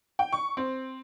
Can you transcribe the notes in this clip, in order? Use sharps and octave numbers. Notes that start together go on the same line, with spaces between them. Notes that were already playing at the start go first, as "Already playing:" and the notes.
G5
C#6
C4